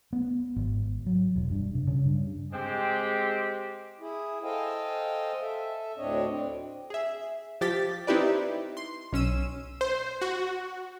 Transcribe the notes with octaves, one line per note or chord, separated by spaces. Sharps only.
B3
G#1
F#3
E1
G2
C3
C#3
G2
G#3 C4 G4
E4 G#4
A4 C5 D#5 F5 G5 G#5
A4 E5
D2 A2 C4 D4 C#5 D#5
C4
G#4 E5
F3 G4 A6 B6
C4 D#4 E4 G4 B4 D5
C6
B1 C#4 E6 D#7
C5
F#4